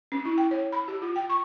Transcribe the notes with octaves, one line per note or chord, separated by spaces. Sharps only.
C#4
E4
G5
C#5
B5
G4
F4
G5
C#6